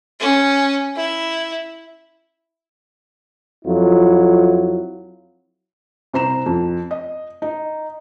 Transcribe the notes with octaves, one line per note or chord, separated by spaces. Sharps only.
C#4
E4
F2 F#3 E4 F4
C2 C5 A#5 E7
F2
D#5
D#4